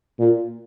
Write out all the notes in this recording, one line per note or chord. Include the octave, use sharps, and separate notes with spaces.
A#2